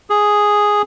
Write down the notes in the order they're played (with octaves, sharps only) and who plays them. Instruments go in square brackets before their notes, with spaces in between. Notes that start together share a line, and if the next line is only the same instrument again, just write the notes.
[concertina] G#4